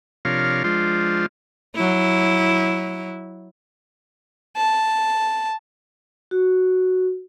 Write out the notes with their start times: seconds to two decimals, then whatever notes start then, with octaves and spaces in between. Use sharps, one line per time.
0.25 C3 F3 D4 A#4 C#5 F5
0.64 F3 G#3 D4 F4 C5
1.76 F#3 E4
4.57 A5
6.31 F#4